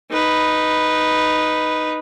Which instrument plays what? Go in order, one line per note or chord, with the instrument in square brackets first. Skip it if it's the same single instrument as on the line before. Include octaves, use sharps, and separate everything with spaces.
[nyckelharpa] D#4 B4